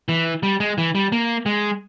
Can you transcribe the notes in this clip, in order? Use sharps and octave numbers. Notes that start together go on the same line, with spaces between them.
E3
G3
G#3
E3
G3
A#3
G#3